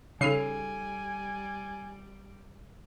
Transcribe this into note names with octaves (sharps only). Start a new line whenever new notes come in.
C#3 G3 D#4 G#4 A4 G#5 C7